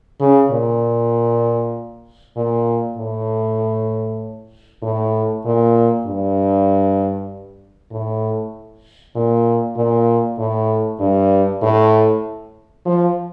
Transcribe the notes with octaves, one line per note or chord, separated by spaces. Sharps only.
C#3
A#2
A#2
A2
A2
A#2
G2
A2
A#2
A#2
A2
G2
A2
F3